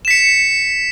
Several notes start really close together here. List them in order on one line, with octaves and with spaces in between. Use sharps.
E7 B6 C#7